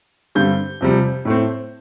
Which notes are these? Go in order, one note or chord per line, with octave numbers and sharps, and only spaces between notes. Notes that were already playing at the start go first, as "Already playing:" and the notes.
G2 D3 G3 C4 G6
F2 C3 G3
A2 A3 C4